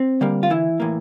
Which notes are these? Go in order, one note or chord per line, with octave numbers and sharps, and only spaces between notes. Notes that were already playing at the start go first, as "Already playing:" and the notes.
Already playing: C4
D3 G3 A#3
F4
E3 E4
A2 E3 A#3